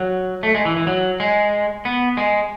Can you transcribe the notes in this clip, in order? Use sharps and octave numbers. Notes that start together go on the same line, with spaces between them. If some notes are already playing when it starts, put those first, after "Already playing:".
Already playing: F#3
A3
G#3
E3
E3
F#3
G#3
B3
G#3